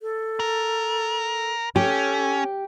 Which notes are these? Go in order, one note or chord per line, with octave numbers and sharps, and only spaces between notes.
A4
A#4
C#4 G4 A4